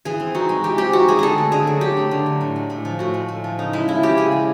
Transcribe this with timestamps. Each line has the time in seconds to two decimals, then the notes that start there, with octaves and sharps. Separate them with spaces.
0.05 E3 G#4
0.20 C4
0.35 D#4 F#4
0.49 G#3
0.64 E3 G4
0.78 C4 G4
0.93 D#4 F#4
1.08 G#3 G#4
1.19 D3 G#4 A4
1.38 A3
1.52 D3 G#4
1.67 F#3
1.81 D3 G4
1.97 A3
2.11 D3
2.26 F#3
2.41 A2
2.56 G#3
2.70 A2
2.85 F3
2.99 A2 F#4
3.14 G#3
3.28 A2
3.44 F3
3.59 C#3 D#4
3.73 G#3 E4
3.88 C#3 E4
4.03 F3 G4
4.17 C#3 G#4
4.32 G#3